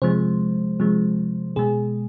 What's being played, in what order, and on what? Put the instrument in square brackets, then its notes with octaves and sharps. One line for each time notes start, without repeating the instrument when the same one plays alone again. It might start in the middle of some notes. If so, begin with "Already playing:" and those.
[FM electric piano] C3 F3 G#3 C5
C3 F3 G#3
B2 G#3 G#4